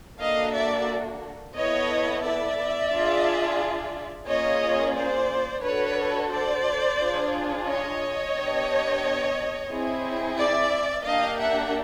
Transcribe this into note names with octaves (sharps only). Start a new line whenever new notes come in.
A#3 D4 F#4 A4 D#5 F5
D5 E5
B3 E4 A4 C#5 D#5
D5 E5
D4 F4 G#4
A#3 C#4 F4 G#4 C#5 D#5
C5 D5
D4 F#4 A4 B4 C#5
C5 D5
D4 F4 G#4
C#5 D#5
B3 D4 G4
C4 E4 G#4
D5 E5
A#3 D4 G4 D#5 F5
E5 F#5